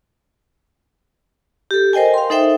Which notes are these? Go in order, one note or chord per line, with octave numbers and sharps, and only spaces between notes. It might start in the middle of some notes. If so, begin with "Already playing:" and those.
G4 A4
A#4 C5 D#5 G5 G#5
F5 C6
D#4 A4 C5 E5 G5